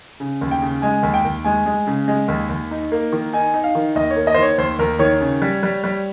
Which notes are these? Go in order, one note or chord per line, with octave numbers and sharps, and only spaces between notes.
C#3
D#2
G5
C#3
G#3 G#5
D#2
G5
D#2
G#3 G#5
G#3
C#3
G#3
D#2
D#2
D#4
A#3
D#3
D#4 G#5
D#4
F5
D#3
D#2 D#5
C#5
A#3
D#5
C5
D#3
C#5
D#2 C5
D#2 A#4
D#3 C#5
C#3
G3
G3
G3